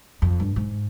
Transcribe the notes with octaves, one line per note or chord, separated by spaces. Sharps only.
F2
G2
G#2